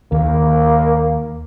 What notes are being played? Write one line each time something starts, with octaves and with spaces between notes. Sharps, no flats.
D#2 A#3